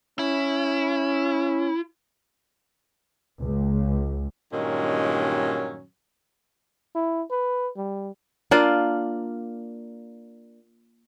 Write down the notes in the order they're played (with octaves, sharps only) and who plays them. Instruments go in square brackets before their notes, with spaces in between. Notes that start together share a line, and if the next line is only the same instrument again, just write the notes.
[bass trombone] C#4 [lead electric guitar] E4
[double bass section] C#2
[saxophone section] G2 A#2 D#3 F#3 G#3 C#4
[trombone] E4
B4
G3
[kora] A#3 D4 F4